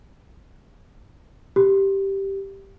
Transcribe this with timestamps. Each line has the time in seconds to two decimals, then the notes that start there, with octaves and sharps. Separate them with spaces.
1.56 G4